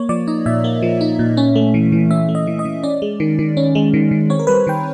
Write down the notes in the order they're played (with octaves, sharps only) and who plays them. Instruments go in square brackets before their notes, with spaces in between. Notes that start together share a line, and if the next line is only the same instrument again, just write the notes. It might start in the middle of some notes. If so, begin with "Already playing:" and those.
Already playing: [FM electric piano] A#3 C#5
F3 D5
D#4 D#5
A#2 E5
A#3
F3
D#4
A#2
C#4
A3
E3
E3
C#4 E5
A3
D#5
E3
D#5
E3
C#4 D5
G#3
D#3
D#3
C#4
G#3
D#3
D#3
C4 C#5
A#4
G3 B4
C5
D#3 G5